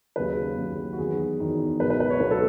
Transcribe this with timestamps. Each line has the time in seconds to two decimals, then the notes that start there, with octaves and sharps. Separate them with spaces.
0.16 D#2 C#3 F#3 B4
0.57 D#2 C#3 F#3
0.93 F#4
0.98 E2 D#3 F#3 G#4
1.39 E2 D#3 F#3
1.80 C#2 B2 F#3 B4
1.90 B4
2.00 B4
2.10 C#5
2.20 C#2 B2 F#3 B4
2.31 A4